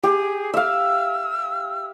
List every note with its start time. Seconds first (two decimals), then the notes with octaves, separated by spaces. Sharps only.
0.03 G4 G#4
0.54 E5 F5 E6